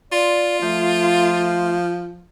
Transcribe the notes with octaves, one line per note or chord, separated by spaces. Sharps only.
F4 D5 C6
F3 A3